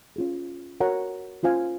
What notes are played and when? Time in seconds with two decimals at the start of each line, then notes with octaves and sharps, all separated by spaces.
0.16 C#4 F4 G#4
0.80 F#4 A#4 C#5 F#5 A#5
1.43 C#4 F4 C5 F5 G#5